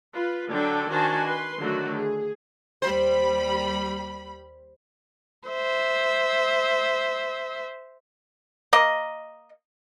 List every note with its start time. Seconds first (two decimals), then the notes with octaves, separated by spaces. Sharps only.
0.14 F4 B4
0.51 D3 F#3 D4 A4 G5
0.90 D#3 D4 F#4 C5 G#5 A5
1.25 B4 C6
1.59 D3 D#3 F#3 A3 F#4
1.97 G#4
2.82 D#2 G3 C5 B5
5.48 C5 E5
8.73 A#3 D#5